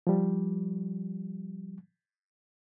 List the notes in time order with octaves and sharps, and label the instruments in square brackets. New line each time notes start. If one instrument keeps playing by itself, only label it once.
[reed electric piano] F3 G3